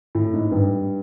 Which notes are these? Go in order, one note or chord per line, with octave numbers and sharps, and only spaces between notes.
A2
G#2
G2